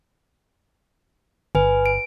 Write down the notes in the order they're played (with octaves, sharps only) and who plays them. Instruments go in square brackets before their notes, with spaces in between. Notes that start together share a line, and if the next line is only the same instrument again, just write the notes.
[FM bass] G1 [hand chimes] B4 G#5
[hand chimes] D7